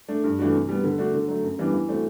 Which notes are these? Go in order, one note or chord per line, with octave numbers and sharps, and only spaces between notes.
A3 D4
G2
E3 A3 D4 F#4
C3
G3 B3
D3
A3 D4 F#4
D3
F#3 A3
F#2
E3 G3 B3 D4
E3
A3 C4 F#4